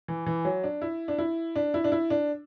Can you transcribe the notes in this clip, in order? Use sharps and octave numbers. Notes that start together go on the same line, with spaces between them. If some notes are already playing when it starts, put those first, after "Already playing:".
E3
E3
F#3
D4
E4
D4
E4
D4
E4
D4
E4
D4